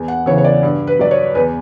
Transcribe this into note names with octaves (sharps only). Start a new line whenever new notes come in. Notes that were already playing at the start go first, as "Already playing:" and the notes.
Already playing: E2
F#5
C#3 E3 C#5
C#5
D5
G2
B4
F#3 D5
C#5
E2 B4